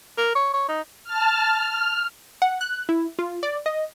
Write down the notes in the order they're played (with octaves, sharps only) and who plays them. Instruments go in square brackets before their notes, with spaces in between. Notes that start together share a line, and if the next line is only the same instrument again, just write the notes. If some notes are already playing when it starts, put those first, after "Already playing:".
[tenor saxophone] A#4
C#5
C#5
D#4
[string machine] A5 F6
F6
[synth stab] F#5
F#6
E4
F4
D5
D#5